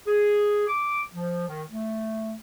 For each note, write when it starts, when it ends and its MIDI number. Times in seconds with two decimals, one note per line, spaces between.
0.07 0.65 68
0.68 1.02 86
1.13 1.46 53
1.48 1.62 51
1.71 2.35 57